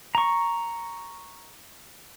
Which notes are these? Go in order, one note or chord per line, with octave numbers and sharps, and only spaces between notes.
A#5 C#6